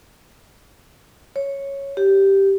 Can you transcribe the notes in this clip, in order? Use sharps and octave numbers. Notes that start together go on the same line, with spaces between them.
C#5
G4